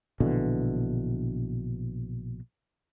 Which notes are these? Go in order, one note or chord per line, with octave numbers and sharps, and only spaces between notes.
A#1 B2 D3 E3